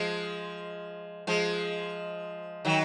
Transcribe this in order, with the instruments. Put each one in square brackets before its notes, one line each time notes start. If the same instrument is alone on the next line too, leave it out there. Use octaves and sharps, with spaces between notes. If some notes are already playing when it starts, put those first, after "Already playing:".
Already playing: [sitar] F3 G#3
F3 G#3
D#3 F#3